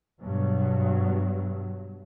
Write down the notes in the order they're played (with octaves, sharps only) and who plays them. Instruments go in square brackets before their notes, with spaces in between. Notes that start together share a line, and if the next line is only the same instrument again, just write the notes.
[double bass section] G2 B2 F#3